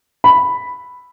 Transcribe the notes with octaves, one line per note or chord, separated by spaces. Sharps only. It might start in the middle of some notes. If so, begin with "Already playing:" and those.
B5